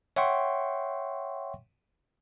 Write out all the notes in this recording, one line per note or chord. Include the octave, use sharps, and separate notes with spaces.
C#5 E5 F#5 G5 C6 C#6